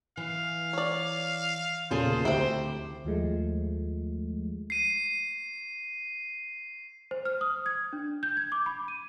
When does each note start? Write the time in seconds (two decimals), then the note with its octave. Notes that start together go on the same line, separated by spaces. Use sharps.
0.17 E3 F5
0.73 C#5 D5
1.91 E2 A#2 C#3 F4 G#4 A4 C5
2.25 D2 C4 E4 G4
3.05 D#2 F3 G#3 A3
4.70 C7 D#7
7.11 C5
7.25 F6
7.41 D#6
7.66 G#6
7.93 D4
8.23 G6
8.37 G#6
8.52 D6
8.66 B5
8.88 D#7